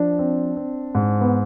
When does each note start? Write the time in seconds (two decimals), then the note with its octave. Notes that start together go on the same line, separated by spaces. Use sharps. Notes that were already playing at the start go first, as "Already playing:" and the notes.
Already playing: F3 D4
0.19 C4
0.57 C4
0.95 G#2
1.21 B3